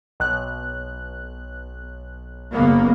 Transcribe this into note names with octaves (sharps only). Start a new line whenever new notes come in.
B1 F#6
F#1 A#3 B3